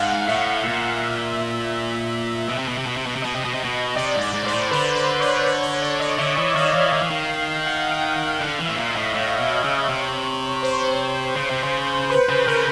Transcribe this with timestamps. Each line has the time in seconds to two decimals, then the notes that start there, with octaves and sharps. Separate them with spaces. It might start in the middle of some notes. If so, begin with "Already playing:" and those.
Already playing: G#2 F5 F#5
0.27 A2 E5
0.64 A#2
2.48 B2
2.58 C3
2.68 B2
2.78 C3
2.87 B2
2.97 C3
3.06 B2
3.16 C3
3.22 B2 D#5
3.35 C3
3.45 B2
3.54 C3
3.64 B2
3.96 C3 D5
4.15 G#2
4.21 D5
4.34 G#2
4.44 G#2 C5
4.52 A2
4.71 D3 B4
4.95 D5
5.20 C#5
5.45 C#5
5.63 C#5
5.82 D5
6.00 D#5
6.18 D3 E5
6.37 E3
6.55 D#3 F5
6.74 E3
6.93 D#3
7.02 E3
7.11 D#3
7.66 F#5
7.91 G5
8.15 F#5
8.40 D3 F5
8.59 E3
8.66 A2 E5
8.77 A#2
8.90 D#5
8.96 A2
9.15 A2 C#5
9.39 B2
9.64 C#3
9.89 C3
10.63 C5
11.36 C#3
11.50 C3
11.63 C#3
12.10 B4
12.29 C#3
12.47 C#3 A#4